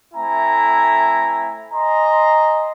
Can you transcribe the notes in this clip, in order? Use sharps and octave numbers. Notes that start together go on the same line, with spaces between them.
A3 C4 E4 E5 G#5 A#5
D#5 G#5 A#5 C6